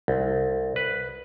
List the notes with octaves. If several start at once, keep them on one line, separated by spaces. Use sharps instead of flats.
C2
B4